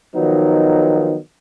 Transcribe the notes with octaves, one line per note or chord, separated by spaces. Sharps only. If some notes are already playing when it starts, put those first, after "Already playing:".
D#3 F3 F#3 B3 D#4